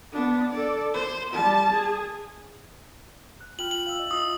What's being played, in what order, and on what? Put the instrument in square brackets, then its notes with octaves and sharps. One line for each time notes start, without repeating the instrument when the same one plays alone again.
[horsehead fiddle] B3 D4
A4 D5
C5
G3 A5
G#4
[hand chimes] F#6
[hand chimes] F4 G5 F6 [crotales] F#7
[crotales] F#7
[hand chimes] F5 E6
D#5
[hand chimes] E4 F4 [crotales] D#6